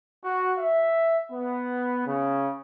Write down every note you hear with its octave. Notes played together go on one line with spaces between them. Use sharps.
F#4
E5
B3
C#3